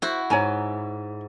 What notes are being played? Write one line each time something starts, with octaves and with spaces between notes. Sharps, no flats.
E4 F#4 C5
G#2 C#5 G#5 A#5